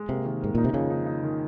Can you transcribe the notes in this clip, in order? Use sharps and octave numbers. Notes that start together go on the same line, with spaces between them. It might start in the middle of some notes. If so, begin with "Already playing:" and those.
Already playing: G#3
C3 A#3
D#3
G#2 A#3
A#2 D#4
C3
F2 C#3
D#4
D#4
D#3